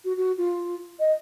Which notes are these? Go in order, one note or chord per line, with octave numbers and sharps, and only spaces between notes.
F#4
F#4
F4
D#5